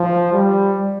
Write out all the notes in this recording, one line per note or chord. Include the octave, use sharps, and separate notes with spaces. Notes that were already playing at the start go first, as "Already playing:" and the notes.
Already playing: F3
G3